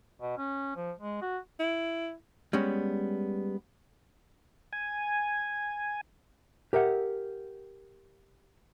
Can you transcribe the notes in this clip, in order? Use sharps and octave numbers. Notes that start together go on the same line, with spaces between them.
B2
C#4
F3
G#3
F#4
E4
G3 G#3 B3 C#4
G#5
G4 A#4 E5 F#5